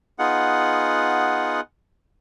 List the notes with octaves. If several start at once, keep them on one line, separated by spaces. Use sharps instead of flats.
B3 D#4 F4 G#4 F#5